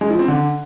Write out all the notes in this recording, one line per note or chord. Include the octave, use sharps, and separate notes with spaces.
G#3
F3
C4
D3